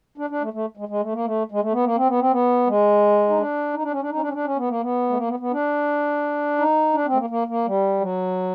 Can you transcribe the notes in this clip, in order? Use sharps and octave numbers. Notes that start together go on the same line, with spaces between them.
D4
D4
A3
A3
G#3
G#3
A3
A#3
A3
G#3
A3
B3
A#3
C4
B3
C4
B3
G#3
D#4
D4
D#4
D4
C#4
D4
D#4
C#4
D4
C#4
D4
C#4
B3
A#3
B3
A3
A#3
B3
B3
D4
D#4
D4
C4
A3
A#3
A#3
A#3
G3
F#3